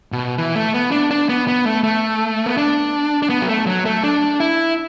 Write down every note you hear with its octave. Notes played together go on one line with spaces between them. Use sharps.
B2
E3
A3
B3
D4
D4
B3
B3
A3
A3
B3
D4
D4
B3
F#3
A3
F#3
A3
D4
E4